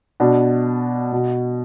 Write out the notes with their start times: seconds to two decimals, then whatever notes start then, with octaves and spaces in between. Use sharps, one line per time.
0.20 B2 D4
1.12 B2